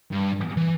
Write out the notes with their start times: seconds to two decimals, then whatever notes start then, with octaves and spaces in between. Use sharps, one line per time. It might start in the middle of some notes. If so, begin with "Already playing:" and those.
0.11 G2
0.57 E3